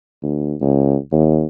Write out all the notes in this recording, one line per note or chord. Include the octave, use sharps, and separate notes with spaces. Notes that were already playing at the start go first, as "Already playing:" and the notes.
D2
C#2
D#2